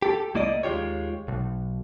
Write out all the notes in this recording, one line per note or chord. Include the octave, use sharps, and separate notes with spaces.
G4 A4
C2 A#3 E4 D5 D#5
D#2 G#3 F4 G4 C#5
B1